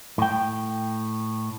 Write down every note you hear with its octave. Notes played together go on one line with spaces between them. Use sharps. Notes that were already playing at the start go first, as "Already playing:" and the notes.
A2 G5